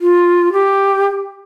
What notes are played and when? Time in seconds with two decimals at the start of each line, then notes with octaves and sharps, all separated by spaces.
0.01 F4
0.53 G4